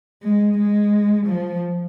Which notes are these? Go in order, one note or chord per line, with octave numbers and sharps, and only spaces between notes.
G#3
G#3
F3